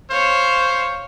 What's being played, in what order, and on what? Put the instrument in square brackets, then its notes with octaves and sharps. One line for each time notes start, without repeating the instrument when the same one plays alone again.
[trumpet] C5 [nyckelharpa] C#5 F5